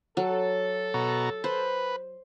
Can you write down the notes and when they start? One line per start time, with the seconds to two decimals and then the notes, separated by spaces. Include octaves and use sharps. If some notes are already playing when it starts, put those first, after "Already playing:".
0.17 F#3 A4
0.94 B2 F#4 A#5
1.44 B4 C5